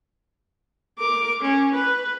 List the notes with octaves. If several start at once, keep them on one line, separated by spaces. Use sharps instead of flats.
A#4 D6
C#4
B4